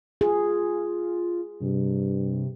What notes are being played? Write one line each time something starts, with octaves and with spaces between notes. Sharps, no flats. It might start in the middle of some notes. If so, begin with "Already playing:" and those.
F4 G#4
G2 C3